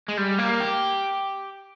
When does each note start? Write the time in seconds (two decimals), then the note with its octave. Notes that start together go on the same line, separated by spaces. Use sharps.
0.09 G#3
0.18 G3
0.39 A#3
0.60 G4